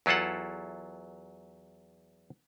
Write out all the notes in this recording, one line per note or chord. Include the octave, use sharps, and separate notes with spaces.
E2 F#3 E4 F4 A4 F#5